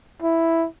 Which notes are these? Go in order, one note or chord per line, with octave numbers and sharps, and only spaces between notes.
E4